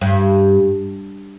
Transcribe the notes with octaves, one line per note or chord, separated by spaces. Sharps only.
G2